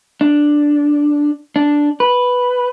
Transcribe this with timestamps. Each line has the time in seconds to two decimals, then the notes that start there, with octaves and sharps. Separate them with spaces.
0.21 D4
1.56 D4
2.00 B4